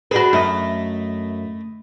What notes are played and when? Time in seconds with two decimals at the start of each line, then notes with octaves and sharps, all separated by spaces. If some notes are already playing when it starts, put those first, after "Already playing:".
0.11 D4 F#4 G#4 B4
0.33 F#2 A3 D#5